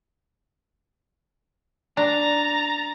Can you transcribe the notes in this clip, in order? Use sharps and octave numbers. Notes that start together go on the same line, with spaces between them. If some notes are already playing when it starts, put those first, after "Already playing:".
D4 A#5 A6